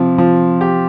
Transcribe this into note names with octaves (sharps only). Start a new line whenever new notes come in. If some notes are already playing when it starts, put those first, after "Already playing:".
Already playing: C3 F3
F3
G4